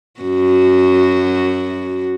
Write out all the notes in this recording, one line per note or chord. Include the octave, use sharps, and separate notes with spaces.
F#2 F#4